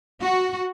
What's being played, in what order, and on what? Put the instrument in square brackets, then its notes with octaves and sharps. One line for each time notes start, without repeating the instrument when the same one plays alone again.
[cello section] F#4